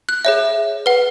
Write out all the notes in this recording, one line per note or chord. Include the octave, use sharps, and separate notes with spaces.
F#6
G#4 C#5 E5
B4 F#5